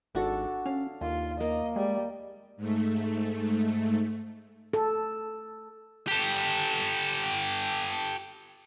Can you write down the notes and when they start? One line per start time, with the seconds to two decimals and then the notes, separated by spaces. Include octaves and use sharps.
0.15 G#1 D4 F#4 A4
0.66 C#4 F5
1.01 D#2 F4
1.40 A#3 D#5
1.76 G3 G#3
2.57 G#2 A3
4.73 A4
6.08 G4 A4